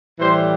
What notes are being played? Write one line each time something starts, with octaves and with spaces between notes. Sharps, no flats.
A2 E3 G3 C5